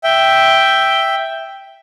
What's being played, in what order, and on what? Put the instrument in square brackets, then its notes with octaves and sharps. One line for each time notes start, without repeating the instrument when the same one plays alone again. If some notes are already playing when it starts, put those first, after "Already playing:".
[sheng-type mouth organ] E5 G5